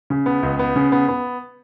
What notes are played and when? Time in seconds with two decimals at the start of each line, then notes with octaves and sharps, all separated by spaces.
0.10 C#3
0.26 B3
0.43 C#2
0.59 B3
0.76 C#3
0.92 B3
1.08 B3